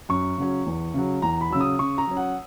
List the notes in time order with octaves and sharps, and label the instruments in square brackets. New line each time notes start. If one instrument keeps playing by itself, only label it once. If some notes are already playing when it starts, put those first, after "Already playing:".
[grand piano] F#2 C#6
C#3 F#3 C#4
E2
C#3 F#3
E2 A#5
B5
C#3 F#3 E6
D#6
C#3 C#6
A#5
F#3 C#4
F#5